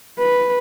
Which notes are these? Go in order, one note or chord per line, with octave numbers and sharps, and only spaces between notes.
B4